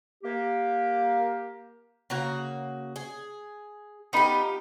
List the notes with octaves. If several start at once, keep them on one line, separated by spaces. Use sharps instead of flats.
A#3 G4
C#3 A#3 F#4
G#4
B3 D#4 F4 G4 B5